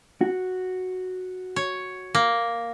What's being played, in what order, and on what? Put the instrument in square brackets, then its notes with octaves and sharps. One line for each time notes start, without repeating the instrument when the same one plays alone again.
[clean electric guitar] F#4
[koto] C#5
A#3